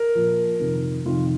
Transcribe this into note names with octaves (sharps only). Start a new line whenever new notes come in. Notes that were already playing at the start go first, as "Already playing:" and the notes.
Already playing: A#4
A#2 F3
F2 C3 D#3
F2 C3 D#3 F4